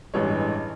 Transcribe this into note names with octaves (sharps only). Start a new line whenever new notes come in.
A1 G2 E3 G#3 C#5